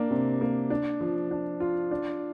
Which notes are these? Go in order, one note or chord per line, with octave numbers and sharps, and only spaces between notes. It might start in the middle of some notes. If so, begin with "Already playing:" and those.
Already playing: A#3 D4
C3
A#3
D4
F3
D4
F4
D4